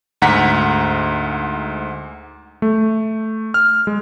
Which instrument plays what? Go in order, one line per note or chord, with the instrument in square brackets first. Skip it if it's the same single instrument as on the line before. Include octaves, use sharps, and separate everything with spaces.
[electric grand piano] D2 G#2 F#5 A#5 B6
A3
F6
G#3